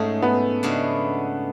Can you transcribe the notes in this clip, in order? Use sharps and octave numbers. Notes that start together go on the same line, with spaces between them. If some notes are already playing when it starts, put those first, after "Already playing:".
Already playing: G#2 G#3 A3 C#4 G#4
B3
C#3 G#3 D4 F#4